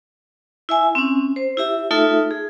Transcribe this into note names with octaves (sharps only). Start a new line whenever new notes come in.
E4 E5 G#5
C4 C#4
C5
E4 G4 E5
A3 D#4 F4 A4 E5
G#4